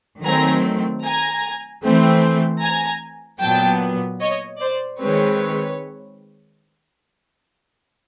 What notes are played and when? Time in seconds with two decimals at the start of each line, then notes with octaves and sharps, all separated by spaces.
0.24 D#3 F#3 A3 C4 G#5 A#5
1.03 G#5 A#5
1.82 E3 A3 C4
2.62 G#5 A#5
3.41 A#2 F#3 B3 G5 A5
4.20 C#5 D#5
4.60 C5 D5
5.00 D#3 G#3 C4 B4 C#5